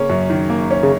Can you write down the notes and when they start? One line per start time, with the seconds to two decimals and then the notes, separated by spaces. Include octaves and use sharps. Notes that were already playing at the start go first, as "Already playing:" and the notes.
Already playing: C#3 A#3 C#4
0.10 F#2
0.30 D#3
0.50 A#3
0.71 C#4
0.83 C#3